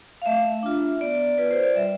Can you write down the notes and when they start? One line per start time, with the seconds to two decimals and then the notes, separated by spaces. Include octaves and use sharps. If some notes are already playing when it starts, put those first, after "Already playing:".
0.22 F5
0.26 A3 E5
0.63 D4 F4
1.01 B3 D5
1.38 F4 B4
1.51 C5
1.63 D5
1.75 G3 E5